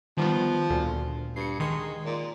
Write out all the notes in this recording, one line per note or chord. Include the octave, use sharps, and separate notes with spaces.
D#3 F3 G3 B3
D2 A#2
G2 C7 C#7
D#3 G#3 D#6 C7
A#2